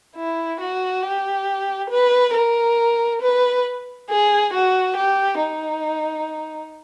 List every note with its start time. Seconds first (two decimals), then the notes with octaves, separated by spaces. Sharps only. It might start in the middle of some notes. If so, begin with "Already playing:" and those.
0.16 E4
0.60 F#4
1.03 G4
1.90 B4
2.34 A#4
3.22 B4
4.09 G#4
4.53 F#4
4.96 G4
5.40 D#4